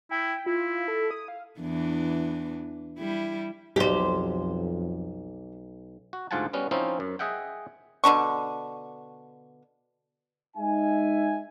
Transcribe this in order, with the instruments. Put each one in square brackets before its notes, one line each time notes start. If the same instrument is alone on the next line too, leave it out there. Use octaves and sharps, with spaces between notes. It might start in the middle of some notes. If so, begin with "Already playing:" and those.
[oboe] E4 [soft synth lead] G5
[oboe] E4 [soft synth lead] F4
[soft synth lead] A4
D#6
F5
[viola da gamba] E2 E3 D4
G3 E4
[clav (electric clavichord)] B1 [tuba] F2 [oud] G4 C5
[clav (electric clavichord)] F#4
D2 G#2 F4 F#5 G#5 A5
G3 B3 C#4 F#4
F3 C4 C#4 D#4 E4
F#2
G#4 D#5 E5 F#5 G5
[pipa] B2 D3 D4 C#6
[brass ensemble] G#3 D#4 E5 G#5